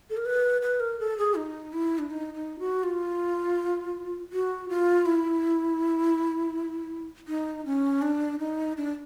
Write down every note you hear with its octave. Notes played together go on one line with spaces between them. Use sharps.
A4
A#4
B4
B4
A#4
A4
G#4
D#4
E4
D4
D#4
D#4
F#4
F4
F#4
F4
E4
D#4
C#4
D4
D#4
D4